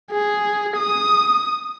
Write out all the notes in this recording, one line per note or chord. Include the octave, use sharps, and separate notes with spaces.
G#4
D#6